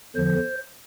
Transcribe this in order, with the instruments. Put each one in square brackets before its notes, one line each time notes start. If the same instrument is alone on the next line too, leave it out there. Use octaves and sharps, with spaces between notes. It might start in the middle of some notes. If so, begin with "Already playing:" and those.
[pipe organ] E2 D3 F3 C5